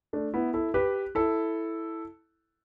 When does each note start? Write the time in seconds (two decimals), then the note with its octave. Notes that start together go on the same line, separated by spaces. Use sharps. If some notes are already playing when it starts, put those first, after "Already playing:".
0.13 A3 D4
0.34 B3 E4
0.54 E4 A4
0.74 G4 B4
1.15 E4 A4